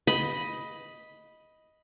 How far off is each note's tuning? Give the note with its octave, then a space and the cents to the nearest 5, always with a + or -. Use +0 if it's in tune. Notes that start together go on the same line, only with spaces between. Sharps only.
D#5 +10 B5 -5